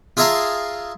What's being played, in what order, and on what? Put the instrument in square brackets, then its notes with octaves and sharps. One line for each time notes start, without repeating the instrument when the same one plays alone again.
[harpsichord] F4 G#4 E5 A5 A#5 C6